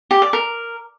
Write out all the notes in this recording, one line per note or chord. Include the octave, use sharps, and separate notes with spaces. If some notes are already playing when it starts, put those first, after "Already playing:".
G4
D5
A#4